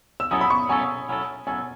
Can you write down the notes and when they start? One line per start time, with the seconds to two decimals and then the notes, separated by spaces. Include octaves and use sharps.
0.20 E6
0.31 F#3 C#4 E4 A4 D#6
0.41 B5
0.50 C#6
0.69 F#3 C#4 E4 A4 G#5
1.09 F#3 C#4 E4 A4
1.47 F#3 C#4 E4 A4 G#5